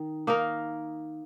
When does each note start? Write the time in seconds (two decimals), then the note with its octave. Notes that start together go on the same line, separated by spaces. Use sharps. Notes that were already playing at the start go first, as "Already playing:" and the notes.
Already playing: D#3 D#4
0.27 A#3 D#4 A#4